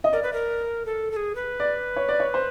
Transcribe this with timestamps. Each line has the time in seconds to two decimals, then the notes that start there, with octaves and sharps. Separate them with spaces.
0.04 D#5
0.13 A#4 D5
0.23 B4
0.33 A#4
0.86 A4
1.11 A4
1.16 G#4
1.35 B4
1.60 D5
1.96 C#5
2.09 D5
2.20 C#5
2.34 C5